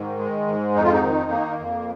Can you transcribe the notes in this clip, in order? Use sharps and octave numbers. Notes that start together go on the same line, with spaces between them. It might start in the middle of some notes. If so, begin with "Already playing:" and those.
Already playing: G#2 D#3
G#3
G#2
F2 D#4
F4
D#4
D#3
A#3
F2